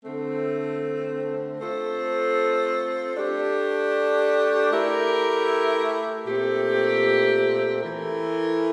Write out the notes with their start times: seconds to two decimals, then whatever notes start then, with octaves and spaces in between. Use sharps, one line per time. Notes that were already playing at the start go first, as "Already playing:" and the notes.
0.04 D3 A3 C4
1.60 A3 C4 F4 A4
3.15 A3 D4 G4
4.71 A3 E4 G4 A#4
6.27 A#2 A3 C4 G4
7.83 E3 A3 E4 A#4